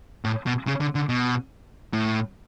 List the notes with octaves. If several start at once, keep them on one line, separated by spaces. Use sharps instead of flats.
A2
B2
C#3
D3
D3
B2
A2